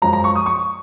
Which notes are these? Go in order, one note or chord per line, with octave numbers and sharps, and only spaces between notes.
F#2 F3 G#3 A#5
A#5
C#6
D#6
C#6